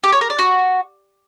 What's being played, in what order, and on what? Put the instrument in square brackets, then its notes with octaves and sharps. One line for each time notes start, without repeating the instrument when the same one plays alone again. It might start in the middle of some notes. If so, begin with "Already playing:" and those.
[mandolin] G4
C#5
A#4
D5
F#4